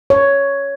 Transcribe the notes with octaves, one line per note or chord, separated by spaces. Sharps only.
C#5